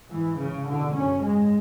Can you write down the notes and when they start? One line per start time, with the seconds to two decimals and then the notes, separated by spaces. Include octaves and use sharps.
0.10 G#2 E3
0.38 G#2 C#3
0.67 E2 B2 D3
0.95 F#2 C#3 C#4
1.22 G#2 G#3